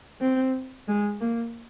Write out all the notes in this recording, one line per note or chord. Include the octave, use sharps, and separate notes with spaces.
C4
G#3
A#3